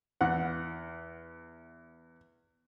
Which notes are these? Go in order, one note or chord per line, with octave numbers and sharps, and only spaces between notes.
E2 F#5